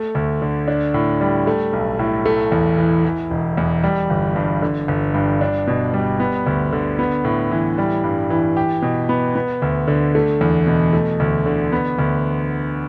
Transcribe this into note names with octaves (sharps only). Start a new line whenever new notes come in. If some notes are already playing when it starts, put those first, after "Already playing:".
Already playing: A3
D2
D3
D4
A2
G3
A3
B1
A2
A3
E2
E3
E3
E1
E2
G3
G1
G2
D3
G1
G2
D4
B2
G3
B3
D2
D3
B3
A2
E3
G3
G2
E3
G4
B2
B3
B3
D2
D3
A3
E2
B2
A3
D2
D3
B3
D2